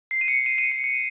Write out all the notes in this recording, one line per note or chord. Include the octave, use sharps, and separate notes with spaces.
C7
D#7
C#7
D#7
D#7
C#7
C#7